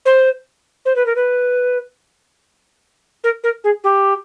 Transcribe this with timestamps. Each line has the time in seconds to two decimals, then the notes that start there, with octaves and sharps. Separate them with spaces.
0.05 C5
0.85 C5
0.96 B4
1.06 A#4
1.15 B4
3.24 A#4
3.43 A#4
3.64 G#4
3.83 G4